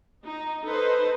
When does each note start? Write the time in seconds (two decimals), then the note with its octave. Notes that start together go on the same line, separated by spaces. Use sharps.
0.23 D#4
0.64 D#4 A4 B4 C5